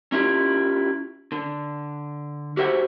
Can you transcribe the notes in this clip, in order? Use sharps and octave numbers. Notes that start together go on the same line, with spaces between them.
C#4 E4 F4 G4
D3
F#4 G4 A4 C5 E5 F#5